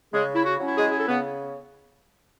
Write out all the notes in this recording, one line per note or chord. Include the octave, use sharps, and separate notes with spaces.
C#3 G#3 G#4
E4
F#4
F#3 C#4 E4
G#3 G#4
G#4
A4
C#3 B3 B4